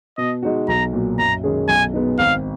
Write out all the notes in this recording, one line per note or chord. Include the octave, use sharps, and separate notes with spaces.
B2 D#5
G#3 D#4 F#4
B1 A#5
A#2 F#3
F#2 A#5
D#3 G#3 C#4 G#4
B1 G#5
B2 G#3 B3 D#4
G#1 F5